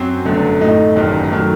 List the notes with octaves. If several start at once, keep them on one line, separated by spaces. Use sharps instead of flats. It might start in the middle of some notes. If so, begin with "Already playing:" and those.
Already playing: F#2 F#3 C4
G1 F#2 D3 A3
A2 A3 D#4
G1 F#2 D#3 G3
D#3 F#3 A3